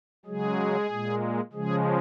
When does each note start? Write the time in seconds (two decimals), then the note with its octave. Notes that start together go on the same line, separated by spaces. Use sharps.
0.25 C#3 F#3 G#3 G#4
0.90 A#2 G#3
1.53 C#3 F3 G#3 G#4